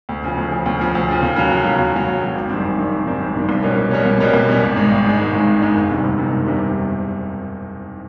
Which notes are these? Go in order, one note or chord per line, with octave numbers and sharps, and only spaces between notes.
D2
C#3 F3
D2
C#3 F3
D2
C#3 F3
D2
C#3 F3
D#2
C#3 F#3
D#2
C#3 F#3
D#2
C#3 F#3
D#2
C#3 F#3
G#1
F#2 D#3 G3 C4
G#1
F#2 D#3 G3 C4
G#1
F#2 D#3 G3 C4
G#1
F#2 D#3 G3 C4
C2
B2 G3 A#3 C#4
C2
B2 G3 A#3 C#4
C2
B2 G3 A#3 C#4
C2
B2 G3 A#3 C#4
G#1
G#2 D#3 G#3
G#1
G#2 D#3 G#3
G#1
G#2 D#3 G#3
G#1
G#2 D#3 G#3
F#1
E2 C3 D#3 G3
F#1
E2 C3 D#3 G3
F#1
E2 C3 D#3 G3